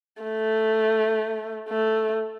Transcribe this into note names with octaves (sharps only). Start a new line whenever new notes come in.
A3
A3